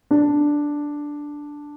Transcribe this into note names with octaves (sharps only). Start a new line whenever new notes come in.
D4